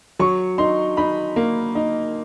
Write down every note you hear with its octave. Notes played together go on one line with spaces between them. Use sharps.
F#3 C#6
D#4 C6
D#4 B5
A#3
D#4